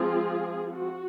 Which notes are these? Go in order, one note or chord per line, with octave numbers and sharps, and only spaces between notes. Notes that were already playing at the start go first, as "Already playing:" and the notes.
Already playing: F3 G#3 C4 F4 G#4
F#4